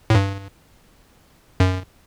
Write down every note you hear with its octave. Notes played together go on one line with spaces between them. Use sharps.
A2
G2
F#2